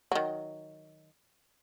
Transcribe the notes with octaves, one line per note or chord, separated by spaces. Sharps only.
D#3 F#3